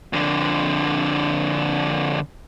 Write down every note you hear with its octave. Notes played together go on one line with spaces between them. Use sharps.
F2 D3